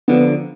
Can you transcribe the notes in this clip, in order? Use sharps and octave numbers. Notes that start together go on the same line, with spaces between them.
D3 F3 B3